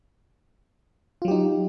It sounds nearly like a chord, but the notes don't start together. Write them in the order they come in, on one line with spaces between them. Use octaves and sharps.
F4 F#3 G4 D#4